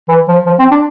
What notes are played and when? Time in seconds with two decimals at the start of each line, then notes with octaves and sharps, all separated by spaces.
0.09 E3
0.28 F3
0.46 F3
0.59 C4
0.71 D4